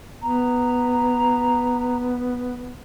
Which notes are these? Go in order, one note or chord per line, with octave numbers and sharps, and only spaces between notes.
B3 A#5